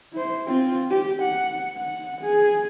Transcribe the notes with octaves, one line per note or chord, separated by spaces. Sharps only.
E4 C5
C4 F4
G4
F#5
F#5
G#4